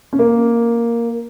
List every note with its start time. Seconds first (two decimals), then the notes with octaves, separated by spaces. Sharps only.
0.13 C#4
0.19 A#3